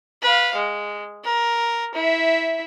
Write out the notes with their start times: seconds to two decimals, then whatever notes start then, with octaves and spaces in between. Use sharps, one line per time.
0.22 B4 F5
0.56 G#3
1.24 A#4
1.95 E4 E5